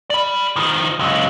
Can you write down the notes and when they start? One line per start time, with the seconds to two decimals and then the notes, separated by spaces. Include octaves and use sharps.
0.10 D5 B5
0.56 D#3 F3
0.99 C#2 F#3